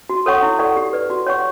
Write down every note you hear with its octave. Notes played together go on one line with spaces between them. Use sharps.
F#4
A4 C#5 F#5 C#6
E4
A4 D5 F#5 C#6
G4
B4 D5
F#4
C#5 F#5 C#6